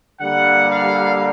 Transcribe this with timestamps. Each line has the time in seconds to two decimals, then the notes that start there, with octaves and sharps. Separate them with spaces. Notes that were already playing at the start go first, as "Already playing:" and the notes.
0.20 D3 G3 A#3 F#5
0.68 F5